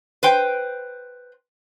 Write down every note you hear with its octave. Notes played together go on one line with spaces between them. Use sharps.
B4 C5 G5